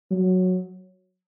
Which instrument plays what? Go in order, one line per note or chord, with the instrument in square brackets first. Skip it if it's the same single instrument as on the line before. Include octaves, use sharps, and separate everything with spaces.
[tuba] F#3